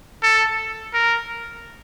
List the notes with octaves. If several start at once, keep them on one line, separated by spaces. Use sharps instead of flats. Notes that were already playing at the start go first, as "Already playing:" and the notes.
A4
A#4